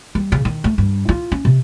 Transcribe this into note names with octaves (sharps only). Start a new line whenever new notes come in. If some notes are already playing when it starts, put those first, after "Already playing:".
G3
C#3
D#3
A3
G2
F4
C#4
C3